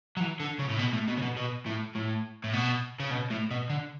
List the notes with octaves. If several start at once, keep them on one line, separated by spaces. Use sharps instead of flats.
F#3
E3
D3
C#3
A2
B2
A2
B2
C#3
B2
B2
A2
A2
A2
B2
C#3
B2
A2
B2
D3